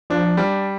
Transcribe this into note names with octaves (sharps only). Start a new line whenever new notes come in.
F3 D4
G3